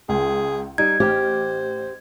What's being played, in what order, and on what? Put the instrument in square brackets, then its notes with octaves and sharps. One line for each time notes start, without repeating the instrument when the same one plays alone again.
[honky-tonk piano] C#2 [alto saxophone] G#4
[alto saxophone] G3 [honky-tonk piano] D#4 [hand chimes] G#6
[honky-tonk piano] A1 F6 [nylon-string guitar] G4 [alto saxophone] C5